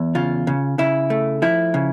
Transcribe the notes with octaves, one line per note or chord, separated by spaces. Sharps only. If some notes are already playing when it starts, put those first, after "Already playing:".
Already playing: E2
C#3 F4
C#3
C#3 E4
A3
F3 E4
C#3